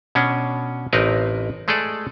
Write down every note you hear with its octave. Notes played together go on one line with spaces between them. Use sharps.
B2 C#4 D4
A1 C4 D#4 A#4 B4
G#3 A3 G#4 A4 D5